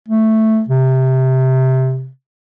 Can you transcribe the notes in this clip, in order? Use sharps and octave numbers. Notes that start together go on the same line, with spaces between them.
A3
C3